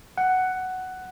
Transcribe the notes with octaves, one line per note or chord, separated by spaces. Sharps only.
F#5